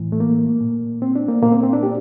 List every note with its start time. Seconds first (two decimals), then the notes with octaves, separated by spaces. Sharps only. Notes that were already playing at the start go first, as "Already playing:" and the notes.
Already playing: A2 E3
0.12 A3
0.20 A#3
0.61 A#2
1.02 C4
1.16 D4
1.28 A#3
1.42 A#2 A#3
1.52 C4
1.63 C4
1.73 D4
1.83 G4